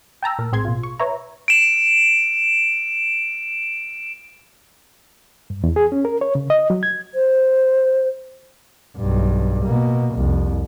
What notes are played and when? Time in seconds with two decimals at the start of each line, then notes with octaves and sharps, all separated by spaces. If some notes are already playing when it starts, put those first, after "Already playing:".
0.23 G5 A5 A#5 E6
0.39 A#2 A#4
0.52 A#1 A2 C4 G#4 C6 G#6
0.65 B2 F4
0.83 C#6
0.99 B4 C#5 E5 A#5
1.48 D7 E7
5.50 G2
5.64 E2
5.76 G#4
5.92 C#4
6.05 A#4
6.21 C#5
6.35 C#3
6.50 D#5
6.70 F#3
6.83 G#6
7.15 C5
8.97 B1 G2
9.64 B2 A#3
10.14 C2 F2